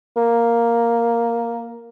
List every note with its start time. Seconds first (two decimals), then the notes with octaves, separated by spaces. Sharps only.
0.17 A#3